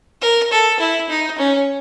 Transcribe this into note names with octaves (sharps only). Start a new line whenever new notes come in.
A#4
A4
E4
D#4
C#4